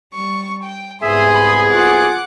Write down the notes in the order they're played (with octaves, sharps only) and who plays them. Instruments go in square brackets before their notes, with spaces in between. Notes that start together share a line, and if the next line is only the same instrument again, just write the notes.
[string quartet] G3 C#6
G5
[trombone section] C2 B3 G#4 [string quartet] G#2 C6 D#6 [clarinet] E5
[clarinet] B5
[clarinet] F4 [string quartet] F#5 D6 F#6